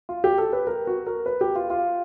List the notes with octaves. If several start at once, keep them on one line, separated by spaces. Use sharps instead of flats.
F4
G4
A4
B4
A#4
F#4
A#4
B4
G4
F4
F4